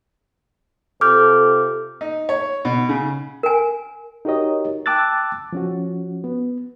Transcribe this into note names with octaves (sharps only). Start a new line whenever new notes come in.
C3 F4 A4 D6 F6 G6
D#4
C#5
B2
C#3
A#4 G#5
D#4 F#4 G4 A#4 C#5 D#5
G5 A5 D6 E6 F#6 A6
F3 C#4 F#4
B3